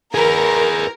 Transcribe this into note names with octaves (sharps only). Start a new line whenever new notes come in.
G#4 A#4 B4